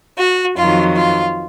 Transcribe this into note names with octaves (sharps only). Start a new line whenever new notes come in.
F#4
F2 D#3 F#3 F4
F4